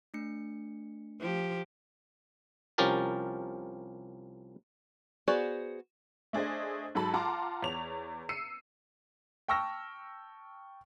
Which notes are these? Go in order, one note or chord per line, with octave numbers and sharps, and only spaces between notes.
A3 D4 C#7
F3 G4
C2 F3 C#4 G4 A#4 A5
B3 F#4 G#4 C5 D5
A3 D4 G#4 C5 D#5
G#2 F#3 A4 A5 B5
F4 F#5 A5 A#5 C6 D6
E2 C#5 F7
E6 C7 C#7 D#7
G5 A5 C#6 E6 F6 A#6